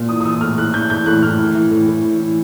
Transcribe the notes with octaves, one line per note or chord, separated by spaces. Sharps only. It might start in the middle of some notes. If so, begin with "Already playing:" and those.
Already playing: A#2
E3 D#6
D#6
E3 E6
A2 F6
A2 F#6
E3 G6
E3 G6
A2 F#6
A2 F6
E3
E3
A2
A2
E3
E3